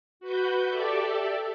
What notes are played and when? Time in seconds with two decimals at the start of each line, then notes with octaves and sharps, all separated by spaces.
0.20 F#4 B4 G6
0.68 G4 A4 D5 E5